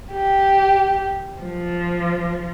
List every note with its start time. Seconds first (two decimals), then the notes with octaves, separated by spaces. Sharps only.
0.11 G4
1.39 F3